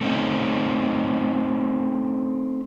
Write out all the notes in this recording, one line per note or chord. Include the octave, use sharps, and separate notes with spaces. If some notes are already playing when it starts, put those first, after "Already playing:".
A3 C4 C#4 D#4